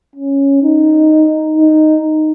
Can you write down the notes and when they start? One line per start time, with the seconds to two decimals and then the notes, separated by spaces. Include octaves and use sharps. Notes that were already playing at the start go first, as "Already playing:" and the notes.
0.16 C#4
0.63 D#4
1.58 D#4